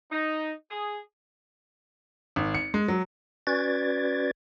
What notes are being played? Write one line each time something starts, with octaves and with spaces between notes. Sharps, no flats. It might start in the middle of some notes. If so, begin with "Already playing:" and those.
D#4
G#4
G#1
C#7
G#3
F#3
C#4 F#4 B4 D5 G#6 A6